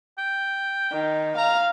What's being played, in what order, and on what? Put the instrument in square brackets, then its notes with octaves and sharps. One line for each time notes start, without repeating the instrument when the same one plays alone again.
[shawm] G5
[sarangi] D#3
[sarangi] F5 [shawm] A#5